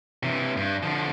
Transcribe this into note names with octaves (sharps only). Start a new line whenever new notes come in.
C3 E3
G2
D3 F3